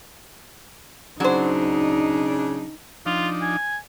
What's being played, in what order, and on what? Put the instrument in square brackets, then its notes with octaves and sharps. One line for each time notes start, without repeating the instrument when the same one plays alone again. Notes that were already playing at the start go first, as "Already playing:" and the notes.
[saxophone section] C#3 D4 [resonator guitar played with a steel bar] F#3 C5 [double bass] D#4
[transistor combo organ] F3 D4 D#4 [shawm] F4
[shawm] G#5